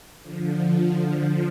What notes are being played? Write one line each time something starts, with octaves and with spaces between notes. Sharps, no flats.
D3 F3